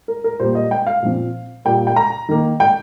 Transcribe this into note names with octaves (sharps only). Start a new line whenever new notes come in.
A#4
A#4
A#2 G3 A#3 C5
D#5
G5
F5
A#2 F3 C4
A#2 G3 A#3 G5
G5
A#5
D#3 A#3
G5